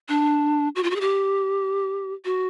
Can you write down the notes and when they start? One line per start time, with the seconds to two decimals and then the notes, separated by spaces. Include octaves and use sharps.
0.09 D4
0.75 F#4
0.83 F4
0.90 F#4
0.96 G#4
1.01 G4
2.25 F#4